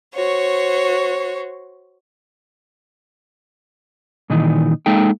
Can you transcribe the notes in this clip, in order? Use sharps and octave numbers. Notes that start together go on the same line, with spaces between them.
F#4 C5 C#5
A#2 D#3 E3 D#4
G#3 A#3 D#4 A4 G5